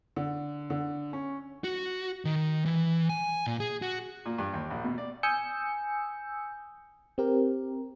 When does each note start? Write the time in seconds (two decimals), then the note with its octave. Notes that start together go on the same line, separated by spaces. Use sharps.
0.16 D3
0.70 D3
1.13 C#4
1.64 F#4
2.25 D#3
2.65 E3
3.09 G#5
3.47 A#2
3.60 G#4
3.82 F#4
4.26 A#2
4.38 G2
4.54 D#2
4.70 A#1
4.84 B2
4.98 D5
5.23 G#5 D#6 E6 G6 C#7
7.18 C4 G4 A#4